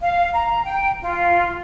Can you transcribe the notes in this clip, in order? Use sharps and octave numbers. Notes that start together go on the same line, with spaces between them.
F5
A#5
G5
F4